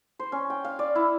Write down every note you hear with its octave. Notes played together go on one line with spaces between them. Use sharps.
C5
C#4
G5
F5
D5
E4